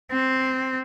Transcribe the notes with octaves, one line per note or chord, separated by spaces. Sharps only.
C4